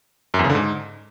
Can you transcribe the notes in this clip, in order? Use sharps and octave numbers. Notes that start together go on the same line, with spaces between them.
F#2
E2
C#3
D3
G#2